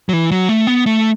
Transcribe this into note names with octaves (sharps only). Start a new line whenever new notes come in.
F#3
E3
F#3
A3
B3
A3